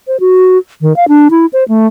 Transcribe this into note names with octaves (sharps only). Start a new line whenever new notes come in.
C5
F#4
D#3
F5
D4
E4
C5
A3